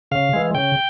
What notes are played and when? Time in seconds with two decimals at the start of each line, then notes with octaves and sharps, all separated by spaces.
0.11 C#3 F5
0.33 E3 G#3
0.54 C#3 G5